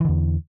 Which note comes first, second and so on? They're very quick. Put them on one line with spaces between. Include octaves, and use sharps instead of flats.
E3 D3 E2